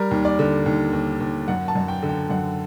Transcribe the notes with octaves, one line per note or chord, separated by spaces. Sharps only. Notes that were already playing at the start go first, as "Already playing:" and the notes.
Already playing: G3 A#4
D#2
D5
D3
D#2
D#2
D#2
F#2 F#5
A5
F#2
G5
D3
G5
F#2 F#5